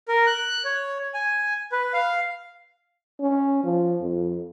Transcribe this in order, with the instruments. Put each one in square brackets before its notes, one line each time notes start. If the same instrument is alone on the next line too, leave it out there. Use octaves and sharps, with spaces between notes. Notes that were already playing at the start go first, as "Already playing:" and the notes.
[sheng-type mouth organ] A#4
F#6
C#5
G#5
B4
F5
[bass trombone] C#4
F3
F2